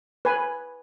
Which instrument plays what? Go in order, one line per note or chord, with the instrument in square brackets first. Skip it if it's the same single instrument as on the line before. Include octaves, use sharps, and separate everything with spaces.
[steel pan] B4 G#5